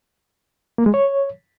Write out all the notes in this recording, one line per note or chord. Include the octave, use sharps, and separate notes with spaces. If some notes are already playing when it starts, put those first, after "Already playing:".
A#3
G#3
C#5